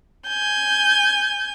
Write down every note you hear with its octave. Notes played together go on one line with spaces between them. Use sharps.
G#5 G6